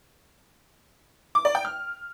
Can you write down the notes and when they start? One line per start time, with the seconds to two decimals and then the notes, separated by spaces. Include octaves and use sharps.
1.35 D6
1.45 D5
1.55 G5
1.65 F6